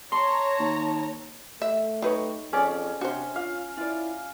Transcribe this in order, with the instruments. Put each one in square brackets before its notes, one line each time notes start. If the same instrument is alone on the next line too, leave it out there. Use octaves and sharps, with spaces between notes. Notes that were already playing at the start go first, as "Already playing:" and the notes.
[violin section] C#5 A#5 [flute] A5 [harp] C6 C#6
[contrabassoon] D#2
[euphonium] A3 [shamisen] E5
[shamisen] F#3 D#4 [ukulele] G4 B4 C#5
[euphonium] F2 [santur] C#4 [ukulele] G#4 C#5 D5
[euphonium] C3 [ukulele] D4 [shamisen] F#4 C5
[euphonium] F4 [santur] F5
[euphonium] E4 [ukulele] F4 D5